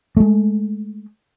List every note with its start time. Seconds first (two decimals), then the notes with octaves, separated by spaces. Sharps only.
0.17 G#3 A3